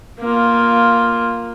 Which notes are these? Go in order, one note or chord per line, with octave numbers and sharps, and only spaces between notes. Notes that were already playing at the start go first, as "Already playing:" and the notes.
A#3 F4